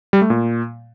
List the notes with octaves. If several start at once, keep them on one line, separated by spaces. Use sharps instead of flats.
G3
A3
A#2